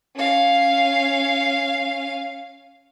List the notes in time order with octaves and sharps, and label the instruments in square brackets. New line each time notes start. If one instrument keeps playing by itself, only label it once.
[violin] C#4 F5